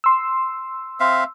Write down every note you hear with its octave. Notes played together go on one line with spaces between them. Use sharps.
C6 E6
C4 E5 F5